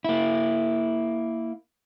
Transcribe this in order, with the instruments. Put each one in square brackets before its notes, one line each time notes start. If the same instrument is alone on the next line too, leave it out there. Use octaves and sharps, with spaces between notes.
[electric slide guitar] A#3 E4